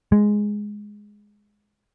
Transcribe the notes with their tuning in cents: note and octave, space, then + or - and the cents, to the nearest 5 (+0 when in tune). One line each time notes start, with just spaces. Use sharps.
G#3 +0